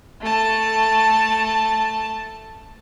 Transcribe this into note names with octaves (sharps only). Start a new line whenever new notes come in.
A3 A5